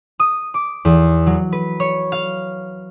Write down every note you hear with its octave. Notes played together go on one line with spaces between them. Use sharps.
D#6
D6
E2
F#3
B4
C#5
F5